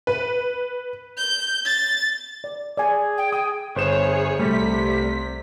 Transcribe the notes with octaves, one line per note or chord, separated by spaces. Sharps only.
B4
G6
A6
D5
G#4 D5 G#5
G5
G5 D#6
G1 G#4 C5 C#5 E7
C2 C3 G3 A3 B6